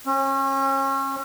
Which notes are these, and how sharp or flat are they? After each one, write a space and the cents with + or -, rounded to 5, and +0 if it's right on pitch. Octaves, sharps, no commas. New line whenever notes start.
C#4 -35